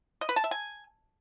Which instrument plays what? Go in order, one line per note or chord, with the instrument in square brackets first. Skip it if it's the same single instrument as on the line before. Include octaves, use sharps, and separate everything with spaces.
[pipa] D#5
B4
A5
E5
G#5